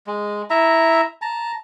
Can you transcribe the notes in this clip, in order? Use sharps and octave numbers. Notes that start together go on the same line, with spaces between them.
G#3
E4 E5 A#5
A5 A#5